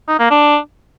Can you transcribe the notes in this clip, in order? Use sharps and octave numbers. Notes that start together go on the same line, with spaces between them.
D#4
A#3
D4